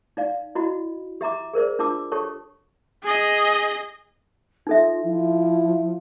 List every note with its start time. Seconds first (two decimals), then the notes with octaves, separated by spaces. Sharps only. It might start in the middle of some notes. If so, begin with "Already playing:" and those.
0.17 D#4 D5 F5
0.55 E4 F#4 D#5 B5
1.21 G4 E5 A#5 D6
1.53 G#4 A#4 C5 D5
1.79 D4 F4 A5 D6 E6
2.12 G4 A4 C#5 A5 C#6
3.03 G#4 D#5
4.67 D#4 F4 A4 E5
5.03 F3 E4